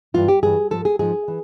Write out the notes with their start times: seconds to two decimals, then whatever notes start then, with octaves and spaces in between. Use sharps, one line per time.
0.14 G2 E3 F4
0.28 G4
0.43 G2 E3 G#4
0.71 G#2 F3 A4
0.85 G#4
0.99 G#2 F3 G#4
1.28 E3